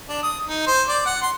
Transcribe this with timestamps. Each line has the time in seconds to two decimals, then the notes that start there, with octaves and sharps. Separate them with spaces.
0.09 D4
0.23 D#6
0.47 D#4
0.67 C5
0.89 D5
1.06 F#5
1.22 C6